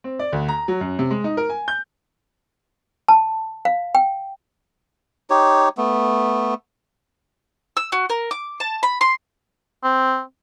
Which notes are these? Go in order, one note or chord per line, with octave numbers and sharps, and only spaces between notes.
C4
D5
D2
A#5
F#3
F#2
C3
G#3
D#4
A#4
G#5
G6
A5
F5
G5
D#4 G4 C#5
A3 B3
E6
F#4
A#4
D6
A5
B5
C6
C4